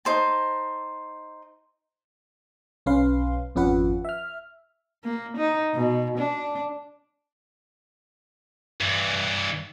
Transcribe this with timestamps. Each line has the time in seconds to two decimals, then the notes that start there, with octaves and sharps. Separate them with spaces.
0.05 D#4 C5 A5
2.86 B1 C#4 B4 F5 C6
3.55 G#1 F2 C#4 F4 B4 F#5
4.05 E5 F6
5.04 A#3
5.37 D#4
5.74 B2
6.18 D4
8.81 G2 E3